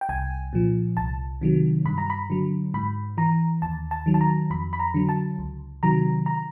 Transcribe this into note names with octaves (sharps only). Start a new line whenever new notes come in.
G5
C2 G#5
A#2 F3
C2 A5
C3 D#3 F#3
G2 B5
A#5
B5
D3 F#3
G#2 B5
E3 A#5
D#2 A5
A5
D#3 F#3
A5
A#5
F2 B5
B5
A#5
D3 F#3
A5
C#2
C3 D#3 F#3 A#5
A#5